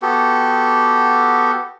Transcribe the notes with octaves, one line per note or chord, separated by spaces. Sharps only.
B3 F#4 G4 A4